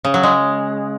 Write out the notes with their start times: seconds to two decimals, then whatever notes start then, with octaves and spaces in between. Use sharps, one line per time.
0.05 C#3
0.14 F#3
0.23 G#3